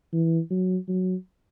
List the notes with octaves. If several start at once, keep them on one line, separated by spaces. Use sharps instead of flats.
E3
F#3
F#3